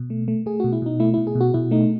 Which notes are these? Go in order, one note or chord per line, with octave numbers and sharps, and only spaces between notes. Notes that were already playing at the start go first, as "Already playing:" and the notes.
Already playing: B2
A3
A3
A3 G#4
B2 F#4
E4
B2 D#4
A3 E4
B2 E4
G#4
B2
F#4
B2 E4
A3 D#4